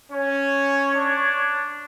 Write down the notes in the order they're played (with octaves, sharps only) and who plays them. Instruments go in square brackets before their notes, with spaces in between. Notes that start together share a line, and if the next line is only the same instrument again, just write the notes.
[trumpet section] C#4 [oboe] C#5
[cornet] D4